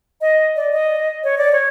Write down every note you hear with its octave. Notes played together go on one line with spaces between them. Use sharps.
D#5
D5
D#5
C#5
D5
C#5